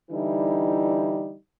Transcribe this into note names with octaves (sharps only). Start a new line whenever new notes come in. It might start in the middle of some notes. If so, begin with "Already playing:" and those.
D3 E3 G3 D#4 E4